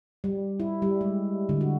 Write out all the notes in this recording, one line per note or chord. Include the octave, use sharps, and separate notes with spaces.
G3
E4
G3
G#3
D3
F#4